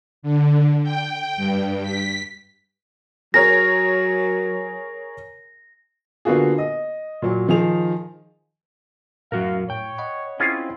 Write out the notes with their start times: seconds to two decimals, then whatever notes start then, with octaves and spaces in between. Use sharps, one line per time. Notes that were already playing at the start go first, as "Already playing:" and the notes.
0.22 D3
0.84 G5
1.37 G2
1.83 B6
3.34 F#3 G#4 A#4 C#5 A#6
6.25 D3 A#3 B3 F4 F#4 G#4
6.58 D#5
7.22 A#2 F#3
7.48 D#3 F3 D#4 G#4 F7
9.32 A2 F#3 F#4 A#4 F5
9.70 A2 C#5 G5
9.98 D#5 F#5 B5
10.40 C4 C#4 E4 F4 G#4